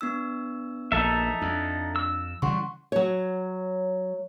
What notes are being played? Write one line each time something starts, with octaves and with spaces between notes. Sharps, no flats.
B3 D4 E6
A#1 D#4 A4 E5
F2 D4
E6
C#3 E3 G3 F#5 C6 C#6
F#3 C#5